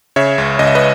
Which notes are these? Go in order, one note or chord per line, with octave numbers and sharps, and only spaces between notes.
C#3 C#5 E5
C#2
C#2 D#5
E5
B4 D#5